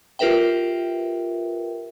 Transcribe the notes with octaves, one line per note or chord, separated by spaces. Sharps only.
F4 G4 A#4 B4 E5 G5